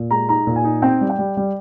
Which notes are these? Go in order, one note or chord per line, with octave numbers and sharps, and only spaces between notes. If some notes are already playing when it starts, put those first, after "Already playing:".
Already playing: A#2
G#3 A#5
D#4 A#5
A#2
G#5
D#4
C4 G5
G3
G5
G3
G3